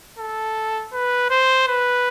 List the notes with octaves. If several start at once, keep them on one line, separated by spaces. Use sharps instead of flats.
A4
B4
C5
B4